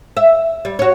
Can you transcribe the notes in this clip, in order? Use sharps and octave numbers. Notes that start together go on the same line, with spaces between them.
E5
G3
F#4 C#5